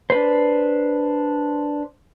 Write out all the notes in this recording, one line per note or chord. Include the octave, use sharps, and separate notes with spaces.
D4 B4 C5